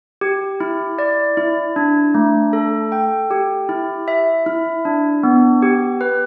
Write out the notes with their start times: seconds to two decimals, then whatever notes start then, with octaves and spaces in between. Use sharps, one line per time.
0.21 G4
0.60 E4
0.99 D5
1.37 E4
1.76 D4
2.14 A3
2.53 A4
2.92 G5
3.31 G4
3.69 E4
4.08 E5
4.46 E4
4.85 D4
5.23 B3
5.62 G4
6.01 B4